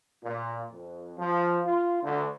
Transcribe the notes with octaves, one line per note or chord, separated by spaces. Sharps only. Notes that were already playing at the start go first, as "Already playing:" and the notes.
A#2
F2
F3
F4
D2